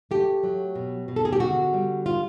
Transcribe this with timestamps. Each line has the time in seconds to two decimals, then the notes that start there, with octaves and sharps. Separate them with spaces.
0.11 A3 G4
0.43 F#3
0.75 B2
1.08 B2
1.16 A4
1.25 G#4
1.33 G4
1.40 D3 F#4
1.73 G3
2.06 F4